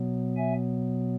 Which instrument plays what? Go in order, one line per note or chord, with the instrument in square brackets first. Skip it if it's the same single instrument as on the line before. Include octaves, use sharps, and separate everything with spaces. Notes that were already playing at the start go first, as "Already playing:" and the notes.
Already playing: [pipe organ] B2 F#3 B3
E5 G#5